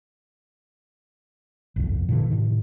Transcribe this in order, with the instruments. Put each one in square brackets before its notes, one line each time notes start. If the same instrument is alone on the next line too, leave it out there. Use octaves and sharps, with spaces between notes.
[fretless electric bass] G1 C2 F2
A#2 D3 E3
A2 C3 D#3